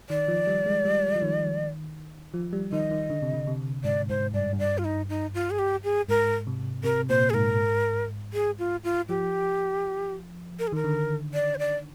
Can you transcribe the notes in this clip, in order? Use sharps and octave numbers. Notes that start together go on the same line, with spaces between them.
D#3 D5
F3
G3
G#3
G3
F3
D#3
F3
G3
D#3 D#5
D#3
D3
C3
D3
C3
G#2 D5
G#2 C5
G2 D5
G2
D5
F4
D#4
D#4
F4
G#4
G4
G#4
G#2 A#4
C3
C3 A#4
A#2 C5
G#4
G#2 A#4
G#4
F4
F4
F3 G4
A#4
G#4
D#3 A#4
D3
D5
C5
D5